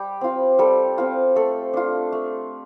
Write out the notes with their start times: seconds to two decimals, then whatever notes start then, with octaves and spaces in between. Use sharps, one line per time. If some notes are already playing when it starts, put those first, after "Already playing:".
Already playing: G3 G4
0.21 C4 F4
0.59 G3 A4
0.98 C4 F4
1.36 A3 A4
1.74 D4 F4
2.12 A3